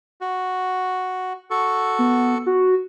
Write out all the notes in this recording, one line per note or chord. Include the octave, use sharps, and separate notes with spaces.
F#4
F#4 A4 C#6
B3
F#4